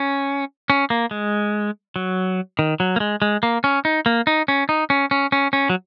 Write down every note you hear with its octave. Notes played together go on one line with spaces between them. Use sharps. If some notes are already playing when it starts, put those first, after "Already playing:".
Already playing: C#4
C#4
A#3
G#3
F#3
D#3
F#3
A#3
G#3
G#3
A#3
C#4
D#4
A#3
D#4
C#4
D#4
C#4
C#4
C#4
C#4
F#3